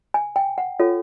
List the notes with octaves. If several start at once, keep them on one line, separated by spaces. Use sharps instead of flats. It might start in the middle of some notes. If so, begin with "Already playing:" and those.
G#5
G5
F#5
F4 A4 C#5